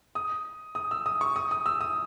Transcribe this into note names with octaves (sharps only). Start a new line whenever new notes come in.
D#6
D#6
E6
D#6
C#6
D#6
D#6
E6
D#6